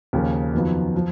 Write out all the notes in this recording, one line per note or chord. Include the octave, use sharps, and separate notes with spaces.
D#2 C#3 F3 A#3 C#4
F2 D#3 F#3 B3 F4
F3